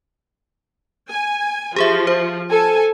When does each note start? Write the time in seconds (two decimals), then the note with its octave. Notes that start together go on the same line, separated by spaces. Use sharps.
1.09 G#5
1.76 F3 G4 G#4 E5
2.07 C5
2.50 A4 G#5